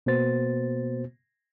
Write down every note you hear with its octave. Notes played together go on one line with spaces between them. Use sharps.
B2 A#3 B3 F#4 C5 A6